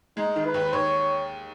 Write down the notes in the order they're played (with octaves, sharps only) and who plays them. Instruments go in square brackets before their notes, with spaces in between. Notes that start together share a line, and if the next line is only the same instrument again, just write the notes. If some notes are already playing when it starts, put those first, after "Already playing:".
[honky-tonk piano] G#3 [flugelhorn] D#4
[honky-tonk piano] D#3
[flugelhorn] B4
[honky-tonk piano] D#2
[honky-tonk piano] D#2 [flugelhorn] C#5